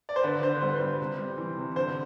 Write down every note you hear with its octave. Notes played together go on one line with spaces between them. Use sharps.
D5
C5
D3 B4
D3 C5
G3 C5
B4
G3 C5
C3
G3
E3
C3
D3 C5